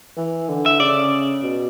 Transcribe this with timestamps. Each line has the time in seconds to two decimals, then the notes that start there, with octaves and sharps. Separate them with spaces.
0.17 E3
0.49 D3
0.66 E5
0.80 C#3 D5
1.43 B2